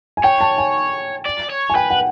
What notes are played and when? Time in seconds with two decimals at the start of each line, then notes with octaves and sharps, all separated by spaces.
0.17 G#5
0.24 C#5 G5
0.41 A5
0.58 G#5
1.25 D5
1.50 C#5
1.70 G#5
1.75 B4 G5
1.90 F#5